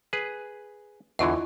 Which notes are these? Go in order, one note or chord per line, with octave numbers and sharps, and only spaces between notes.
G#4 B4
E2 D3 E3 E4 F4 D#5